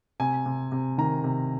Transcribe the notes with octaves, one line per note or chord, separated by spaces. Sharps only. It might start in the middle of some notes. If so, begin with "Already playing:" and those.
C3 G#5
C3
C3
D#3 A#5
C3